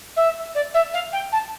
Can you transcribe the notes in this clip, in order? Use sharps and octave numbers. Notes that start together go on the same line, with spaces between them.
E5
D5
E5
F5
G5
A5